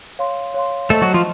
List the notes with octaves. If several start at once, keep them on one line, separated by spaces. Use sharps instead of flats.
C#5 F5 C6
C#5 F5 C6
A3 A4 C5 D#5 A5 C#6
F#3 F#4
F3 F4